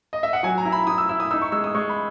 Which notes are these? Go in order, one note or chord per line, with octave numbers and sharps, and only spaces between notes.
D#5
E5
F#5
F#3 G#5
A#5
E4
B5
E4 D#6
E6
E4 E6
D#6
D#4 E6
C#6
G#3 E6
D#6
G#3 C#6
B5